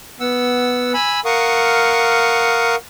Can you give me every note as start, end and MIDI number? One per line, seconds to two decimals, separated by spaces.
0.20 0.93 59
0.20 0.93 78
0.20 0.93 88
0.94 1.20 80
0.94 1.20 83
0.94 1.20 88
1.25 2.75 70
1.25 2.75 77
1.25 2.75 78
1.25 2.75 85
1.25 2.75 87